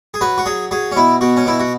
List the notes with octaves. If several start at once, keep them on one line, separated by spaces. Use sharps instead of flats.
G#4
F#3 B4
F#4
F#3 G#4
F#3 G#4
C#4
B2 E4
B2 F#4
C#4
B2 E4
F#4